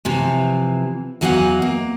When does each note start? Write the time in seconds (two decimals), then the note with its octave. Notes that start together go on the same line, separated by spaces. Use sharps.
0.05 C3 E3 F3
1.21 E2 E3 F#3 D#4 F5 F#5
1.62 A#3